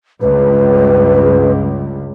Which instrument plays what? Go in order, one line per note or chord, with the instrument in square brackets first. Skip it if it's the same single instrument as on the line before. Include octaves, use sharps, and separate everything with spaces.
[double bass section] C#2 G2 [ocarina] B4